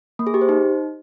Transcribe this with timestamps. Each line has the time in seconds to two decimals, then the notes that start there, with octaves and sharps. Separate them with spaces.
0.19 A#3
0.27 G#4
0.34 G4
0.41 C5
0.49 D#4